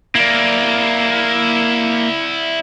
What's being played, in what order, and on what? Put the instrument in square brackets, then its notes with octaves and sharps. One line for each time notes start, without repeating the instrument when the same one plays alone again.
[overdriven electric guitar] A#3 [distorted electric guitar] E4 D5